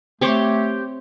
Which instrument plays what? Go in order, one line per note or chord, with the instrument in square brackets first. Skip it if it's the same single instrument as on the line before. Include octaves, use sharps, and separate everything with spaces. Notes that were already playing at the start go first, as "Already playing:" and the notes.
[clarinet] A3 [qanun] C4 C#5 D6 [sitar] G4 C5